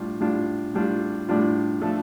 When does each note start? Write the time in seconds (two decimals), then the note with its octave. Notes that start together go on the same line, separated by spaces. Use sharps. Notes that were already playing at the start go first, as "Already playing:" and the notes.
Already playing: A2 G3 D4 F4
0.20 A2 G3 D4 F4
0.74 A2 G3 D4 F4
1.28 A2 G3 D4 F4
1.82 F3 A3 D4 A4